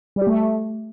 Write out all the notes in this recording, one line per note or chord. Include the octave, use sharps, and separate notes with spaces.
G3
G4
A3